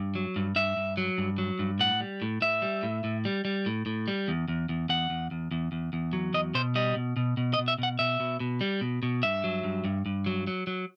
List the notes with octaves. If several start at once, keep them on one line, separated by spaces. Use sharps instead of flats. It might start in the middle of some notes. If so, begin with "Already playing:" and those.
Already playing: G2
F#3
G2
G2 E5
G2
F#3
G2
F#3
G2
A2 F#5
G3
A2
A2 E5
G3
A2
A2
G3
G3
A2
A2
G3
E2
E2
E2
E2 F#5
E2
E2
E2
E2
E2
F#3
E2 D#5
B2 C5
G3 D#5
B2
B2
B2
D#5
B2
E5
B2 F#5
B2 E5
B2
B2
G3
B2
B2
G2 E5
F#3
G2
G2
G2
F#3
F#3
F#3